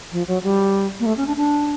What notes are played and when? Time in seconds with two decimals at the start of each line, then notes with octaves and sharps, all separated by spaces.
0.12 F3
0.28 F#3
0.43 G3
1.00 A#3
1.06 A3
1.17 C#4
1.27 D4
1.37 D4